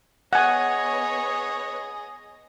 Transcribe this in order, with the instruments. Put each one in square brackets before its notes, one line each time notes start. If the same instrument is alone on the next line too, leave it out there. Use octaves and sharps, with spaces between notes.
[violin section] B3 C#5 [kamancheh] G#4 D#5 [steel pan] F#5 G#5